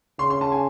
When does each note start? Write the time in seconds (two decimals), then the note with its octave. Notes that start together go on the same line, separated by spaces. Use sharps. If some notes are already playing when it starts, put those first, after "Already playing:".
0.19 C#3 C6
0.30 C6
0.41 A5
0.52 G#5